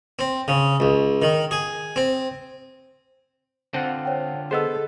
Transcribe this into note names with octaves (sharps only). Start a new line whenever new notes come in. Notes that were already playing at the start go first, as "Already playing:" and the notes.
C4
C#3
C#2
D#3
G#4
C4
D3 C4 F4 F#5
C5 C#5 G5
B3 G#4 A4 C5 D#5 E6